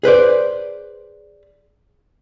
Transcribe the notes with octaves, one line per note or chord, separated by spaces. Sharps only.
G#4 B4 C5 D5